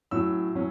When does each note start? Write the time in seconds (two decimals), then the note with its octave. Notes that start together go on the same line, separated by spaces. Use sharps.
0.11 A2 F#3 C#4 E6
0.55 A2 F#3 C#4